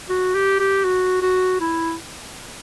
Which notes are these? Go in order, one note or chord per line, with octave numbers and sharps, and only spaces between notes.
F#4
G4
G4
F#4
F#4
E4